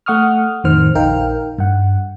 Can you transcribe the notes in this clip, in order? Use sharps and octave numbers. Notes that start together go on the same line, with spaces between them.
A3 F#5 C#6 D#6 F6
F2 A2 D#3 C5 F6
A#1 D#4 A#4 F5 G5 F6
G2 F#5